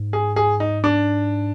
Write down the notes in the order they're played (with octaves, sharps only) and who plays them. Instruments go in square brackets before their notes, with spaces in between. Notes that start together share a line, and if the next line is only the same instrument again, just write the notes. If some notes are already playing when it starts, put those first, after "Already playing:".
Already playing: [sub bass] G#2
[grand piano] G#4
G#4
D#4
D4